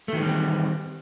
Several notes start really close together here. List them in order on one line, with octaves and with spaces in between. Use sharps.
A3 D#3 E3 G3 C4